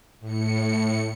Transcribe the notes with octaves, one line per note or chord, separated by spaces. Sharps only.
A2 C#7